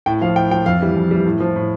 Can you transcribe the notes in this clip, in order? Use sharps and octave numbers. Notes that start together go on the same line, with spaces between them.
A2 G5
F3 F5
A2 G5
F3 G5
F2 F5
E3 G3
F2
E3 G3
A2
F3
A2